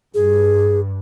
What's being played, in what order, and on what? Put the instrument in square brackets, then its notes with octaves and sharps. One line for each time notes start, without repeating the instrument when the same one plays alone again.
[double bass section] G2 [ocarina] G#4